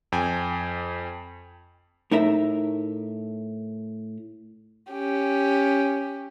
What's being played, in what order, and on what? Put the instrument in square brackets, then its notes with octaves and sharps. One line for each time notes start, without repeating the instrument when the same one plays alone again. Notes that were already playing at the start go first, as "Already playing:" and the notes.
[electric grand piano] F2 G5 G#5
[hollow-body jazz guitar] A2 D#4 A#4 E5 A#5
[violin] C#4 G4